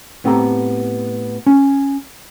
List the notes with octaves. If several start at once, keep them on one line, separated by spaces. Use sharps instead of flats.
A2 B3 C4 G4 A4 A#5
C#4